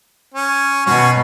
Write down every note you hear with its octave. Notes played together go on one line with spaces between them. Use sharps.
C#4
B2 C#4 F#4 C#5